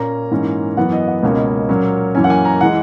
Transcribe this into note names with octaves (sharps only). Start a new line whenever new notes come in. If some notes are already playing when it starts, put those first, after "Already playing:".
Already playing: A#2 A#3 C#4 A#5
G#2 E3 A#3 C#4
F#2 E3 B3 F#5
D#5
F#5
C#2 B2 A#3 C#4 D#5
A#2 F#3 A#3 C#4
F#2 E3 A#3 C#4 G#5
F#5
G#5
A#5
E3 G#3 F#5